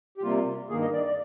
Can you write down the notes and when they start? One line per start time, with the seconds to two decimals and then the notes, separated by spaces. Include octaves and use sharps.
0.18 G4
0.22 C3 G3 A#3 F4
0.70 G2 D#3 A#3 G#4
0.81 D#5
0.93 D5
1.05 D5